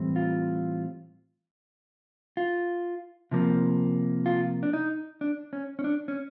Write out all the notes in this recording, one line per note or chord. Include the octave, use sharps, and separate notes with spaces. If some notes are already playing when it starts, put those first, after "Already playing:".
Already playing: A2 E3 G3 C4
F4
F4
C3 F3 A#3
F4
D4
D#4
D4
C#4
C#4
D4
C#4